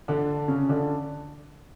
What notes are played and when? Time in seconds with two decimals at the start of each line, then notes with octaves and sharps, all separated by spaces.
0.08 D3 D4
0.48 C#3 C#4
0.69 D3 D4